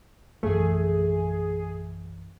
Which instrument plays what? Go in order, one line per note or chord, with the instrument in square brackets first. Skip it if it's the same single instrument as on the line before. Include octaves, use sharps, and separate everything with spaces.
[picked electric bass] A#1 F#2 E3 [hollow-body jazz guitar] A3 [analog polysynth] G#4